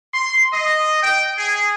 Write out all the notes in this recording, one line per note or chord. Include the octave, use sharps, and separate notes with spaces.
C6
D#5
G5
G#4